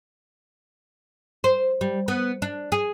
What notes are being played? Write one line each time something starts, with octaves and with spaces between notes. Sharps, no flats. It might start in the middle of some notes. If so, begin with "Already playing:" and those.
C5
G3
B3
D4
G#4